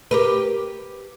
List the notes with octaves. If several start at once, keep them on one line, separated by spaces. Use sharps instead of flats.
G4 A#4 B4